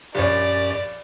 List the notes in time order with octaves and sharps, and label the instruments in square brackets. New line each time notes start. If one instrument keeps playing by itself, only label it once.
[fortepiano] A#1 C#5 [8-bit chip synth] F#2 G4 [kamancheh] D5